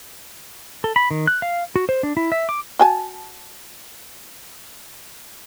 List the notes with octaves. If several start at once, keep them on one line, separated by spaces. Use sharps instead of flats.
A4
B5
D#3
F#6
F5
F#4
C5
D4
E4
E5
D6
F#4 G#5 A5